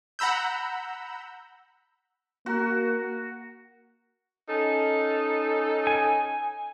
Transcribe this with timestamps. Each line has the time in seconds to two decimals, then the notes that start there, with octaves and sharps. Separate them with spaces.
0.19 F#5 A#5 B5 E6 G6
2.46 A#3 F#4 A#4
4.48 C#4 D#4 A4
5.87 G#5